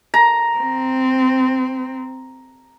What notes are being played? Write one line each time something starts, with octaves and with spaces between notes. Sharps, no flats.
A#5
C4